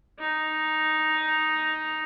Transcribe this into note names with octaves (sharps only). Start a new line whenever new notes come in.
D#4